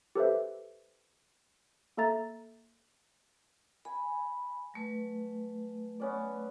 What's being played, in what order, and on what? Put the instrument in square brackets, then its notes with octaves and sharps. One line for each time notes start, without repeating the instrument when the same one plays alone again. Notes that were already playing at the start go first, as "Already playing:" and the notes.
[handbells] G4 A4 B4 C5 E5
A#3 A4 E5 A#5 A6
[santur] G#5 [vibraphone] B5
[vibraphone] F#3 A3 B4
[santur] B3 C#4 D5